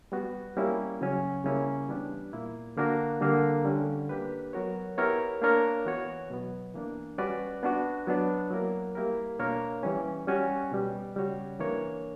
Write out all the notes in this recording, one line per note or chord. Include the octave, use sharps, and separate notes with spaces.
G3 B3 F#4
G3 A#3 C#4 E4
C#3 F#3 C#4
C#3 G3 A#3 C#4 E4
E3 G3 B3 D4 G4
A#2 A#3 E4
D3 A#3 D4 F#4 A#4
D3 G3 A#3
D3 G3 C#4
A#3 D4 G4 B4
F#3 B3 F#4 A#4 C#5
B3 E4 G4 A#4 C#5
A#3 D4 A#4 C#5
E3 B3 F#4 C#5
B2 F#3 B3
E3 A#3 D4
G3 C#4 F#4 B4 D5
B3 D4 F#4
F#3 B3 D4
F#3 A#3 E4 A#4
G3 A#3 E4 G4 A#4
B2 A#3 D4 A#4 C#5
E3 G3 C#4
G3 C#4 F#4
B2 G3 B3
C#3 G3 C#4 F#4 C#5
E3 A#3 D4 A#4 C#5